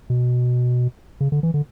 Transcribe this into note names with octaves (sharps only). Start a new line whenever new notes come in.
B2
C#3
D3
E3
D3